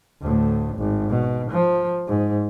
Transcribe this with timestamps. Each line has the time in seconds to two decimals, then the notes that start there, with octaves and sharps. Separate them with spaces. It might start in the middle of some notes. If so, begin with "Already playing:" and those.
0.22 D2 A2
0.77 G#1
1.09 B2
1.51 F3
2.07 G#2